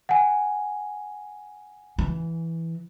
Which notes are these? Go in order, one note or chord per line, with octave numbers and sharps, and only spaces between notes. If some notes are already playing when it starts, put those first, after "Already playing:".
F#5 G#5
E3